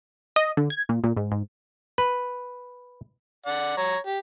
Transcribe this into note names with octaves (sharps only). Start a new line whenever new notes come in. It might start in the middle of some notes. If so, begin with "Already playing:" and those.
D#5
D3
G#6
A#2
A#2
G#2
G#2
B4
D5 F#5
C#5 A#5
G4